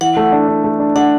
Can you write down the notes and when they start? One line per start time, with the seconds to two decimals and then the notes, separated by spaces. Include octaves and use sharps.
0.01 E3 F#5
0.17 A3
0.32 D4
0.48 D4
0.64 A3
0.79 D4
0.95 D4 F#5